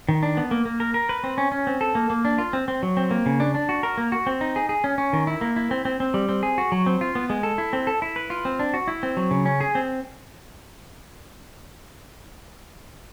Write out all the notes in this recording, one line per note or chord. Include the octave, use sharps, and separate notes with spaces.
D#3
D4
B3
A#3
A#3
A#4
A#4
B4
C4
C#4
C#4
C4
A4
A#3
A#3
D4
F4
C4
C4
F#3
C4
A#3
C#3
D4
D4
F#4
A#4
A#3
F#4
C4
D#4
G#4
G#4
C#4
C#4
D#3
E4
A#3
E4
C4
C4
C4
G3
C4
G#4
F#4
F#3
C4
F4
B3
G#3
A4
E4
C4
A4
E4
B4
F4
C4
D4
F#4
E4
C4
F#3
C#3
C#4
G#4
C4